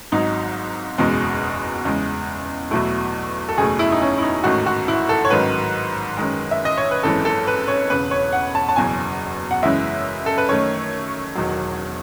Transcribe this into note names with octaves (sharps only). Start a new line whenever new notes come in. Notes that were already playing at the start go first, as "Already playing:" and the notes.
G#1 G#2 F#3 D#4
F#1 E2 B2 G#3
E2 C#3 G#3
E2 B2 F#3 A3 E4
A4
F#1 E2 B2 A3 G#4
E4
D#4
C#4
E4
D#4
A1 G#2 D#3 A3 F#4
F#4
E4
A4
C#5
A1 G#2 D#3 F#3 B4
F#2 D#3 G#3
E5
D#5
C#5
B4
G#1 F#2 E3 G#3 A4
A4
B4
C#5
E1 E2 C#3 B4
C#5
F#5
A5
A5
F#1 E2 B2 F#3 G#5
F#5
F#2 C#3 E3 G#3 E5
A4
B4
F#2 D#3 A3 C#5
E1 E2 D#3 F#3